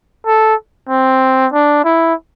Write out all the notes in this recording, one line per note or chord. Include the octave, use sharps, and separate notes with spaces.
A4
C4
D4
E4